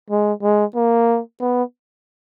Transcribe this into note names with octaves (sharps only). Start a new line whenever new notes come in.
G#3
G#3
A#3
B3